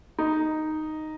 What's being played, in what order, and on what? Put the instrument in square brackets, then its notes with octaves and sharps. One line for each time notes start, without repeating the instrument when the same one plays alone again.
[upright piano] D#4